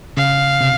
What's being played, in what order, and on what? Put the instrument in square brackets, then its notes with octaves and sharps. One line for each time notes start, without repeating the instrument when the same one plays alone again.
[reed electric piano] C#3 [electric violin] F5
[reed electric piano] C3